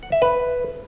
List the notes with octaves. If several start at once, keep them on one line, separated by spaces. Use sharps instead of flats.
F#5
E5
B4